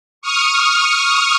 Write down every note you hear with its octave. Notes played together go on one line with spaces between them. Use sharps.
C#6 D#6 F6